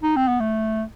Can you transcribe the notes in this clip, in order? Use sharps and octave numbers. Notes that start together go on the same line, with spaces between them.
D#4
C4
B3
A3